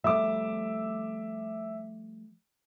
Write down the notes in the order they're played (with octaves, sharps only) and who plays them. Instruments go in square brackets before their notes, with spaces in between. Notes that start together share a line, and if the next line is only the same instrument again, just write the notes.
[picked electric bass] F3 G3 A3 [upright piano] E5 D6